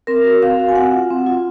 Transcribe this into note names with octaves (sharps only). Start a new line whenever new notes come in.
C4 A#4
F#4
C4 F5
F#4
G#5
C4 F#5
F4
C4
F4